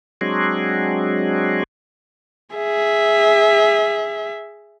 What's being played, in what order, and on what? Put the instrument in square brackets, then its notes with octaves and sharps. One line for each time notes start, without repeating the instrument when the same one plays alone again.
[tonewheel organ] F#3 G#3 C4 D4 F#4 G#4
[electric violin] G#4 E5